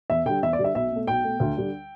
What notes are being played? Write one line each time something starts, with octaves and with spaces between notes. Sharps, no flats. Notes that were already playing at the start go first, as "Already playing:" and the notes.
E2 E5
D3 G3 G5
E2 E5
D5
D3 G3
E5
B1 E5
B2 A3
B1 G5
B2 A3
D2
D3 G3